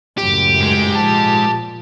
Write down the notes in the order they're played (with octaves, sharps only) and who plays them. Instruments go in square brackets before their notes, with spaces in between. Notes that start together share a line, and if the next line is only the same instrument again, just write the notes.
[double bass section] C#2 F#2 A2 [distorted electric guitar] G4
[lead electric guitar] G#2 G#3
[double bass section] A#2 F3 [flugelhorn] A5